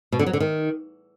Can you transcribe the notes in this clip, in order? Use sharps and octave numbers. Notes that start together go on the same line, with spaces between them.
B2
D3
F#3
D3
D#3